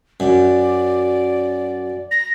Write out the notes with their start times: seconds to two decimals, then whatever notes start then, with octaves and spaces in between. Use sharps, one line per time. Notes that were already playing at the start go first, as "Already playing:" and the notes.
0.20 F#2 D5
2.11 A#6